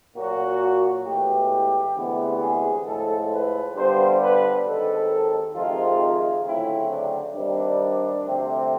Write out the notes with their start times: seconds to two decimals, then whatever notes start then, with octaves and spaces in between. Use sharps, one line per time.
0.16 A#2 F#3 A#3 F#4
1.06 A2 E3 G#3 B3 G4
1.96 D2 C3 E3 G#3 B3
2.41 G#4
2.85 A2 F3 G#3 A4
3.31 B4
3.75 G2 D3 G3 B3 C5
4.19 B4
4.65 D#2 D#3 G#3 C4 A4
5.54 F2 C3 D#3 G#3 F4
6.44 D2 C#3 F#3 A3 C4 E4
6.90 D4
7.34 G2 D#3 G3 C4 D4
8.24 D2 C3 F3 A3 C4